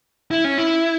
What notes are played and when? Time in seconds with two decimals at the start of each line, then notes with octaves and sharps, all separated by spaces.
0.31 E4
0.44 C#4
0.58 E4